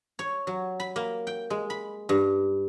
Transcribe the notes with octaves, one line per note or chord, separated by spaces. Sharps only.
C#5
F#3
B5
A#3
G5
G#3
B5
G2